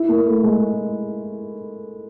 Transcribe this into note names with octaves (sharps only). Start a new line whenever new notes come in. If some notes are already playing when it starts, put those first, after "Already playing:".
Already playing: E4
A#3
A3
G#3